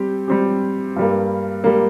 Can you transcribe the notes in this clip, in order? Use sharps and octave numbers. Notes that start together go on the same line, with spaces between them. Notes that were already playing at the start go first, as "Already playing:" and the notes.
Already playing: G3 C4 G4
G3 C4 G4
G2 G3 A#3
G3 A#3